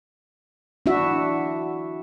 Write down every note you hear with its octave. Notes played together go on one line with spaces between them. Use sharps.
D4 E4 F#4 E5